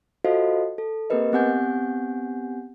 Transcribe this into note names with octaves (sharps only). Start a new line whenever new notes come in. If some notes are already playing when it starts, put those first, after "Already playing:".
F4 F#4 A4 C5 D#5 F5
A4
A#3 C4 G4 A#4 B4 D#5
B3 C4 G4 F#5 G#5 G6